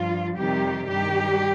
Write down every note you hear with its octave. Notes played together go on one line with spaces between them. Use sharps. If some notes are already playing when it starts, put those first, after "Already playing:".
Already playing: G2 F3 F4
F2 C3 D#3 G3 G4
G2 D#3 G3 G4